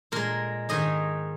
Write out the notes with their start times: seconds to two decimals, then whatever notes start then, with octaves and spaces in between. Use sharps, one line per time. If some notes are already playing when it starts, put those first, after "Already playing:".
0.12 A#2 G#3 A#4
0.69 G#2 D#3 G#3 D#5